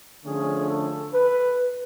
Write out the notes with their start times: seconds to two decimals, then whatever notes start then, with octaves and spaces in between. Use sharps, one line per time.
0.25 D3 F3 A3 C#4 G#4
0.68 A4
1.13 B4